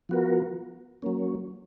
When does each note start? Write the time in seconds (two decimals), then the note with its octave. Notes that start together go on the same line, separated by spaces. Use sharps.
0.09 F3 B3 F#4 A#4
1.02 F#3 A#3 C#4